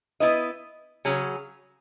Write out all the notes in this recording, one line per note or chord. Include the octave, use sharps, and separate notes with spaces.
B3 E4 B4 D#5
C#3 F#3 C#4 G#4